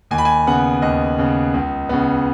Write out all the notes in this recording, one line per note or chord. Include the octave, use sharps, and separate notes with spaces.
D#2 G#5
B5
G#5
C#3 B3 F#5
D#2 D#5
C#3 B3
C#2
C#3 B3